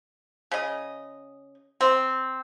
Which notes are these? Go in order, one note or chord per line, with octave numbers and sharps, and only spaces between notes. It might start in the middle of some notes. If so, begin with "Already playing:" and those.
C#3 D#5
C4